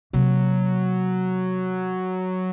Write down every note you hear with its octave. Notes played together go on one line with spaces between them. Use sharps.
C3 F#3 A#3